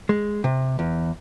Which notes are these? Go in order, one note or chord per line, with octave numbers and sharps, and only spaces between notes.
G#3
C3
E2